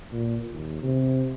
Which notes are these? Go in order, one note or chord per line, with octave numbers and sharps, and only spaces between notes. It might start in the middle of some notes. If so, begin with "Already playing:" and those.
A#2
D#2
C3